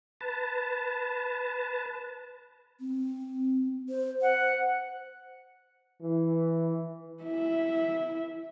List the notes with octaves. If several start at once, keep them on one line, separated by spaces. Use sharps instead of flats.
B4 A5
C4
C5
C5 F#5
E3
E4 E5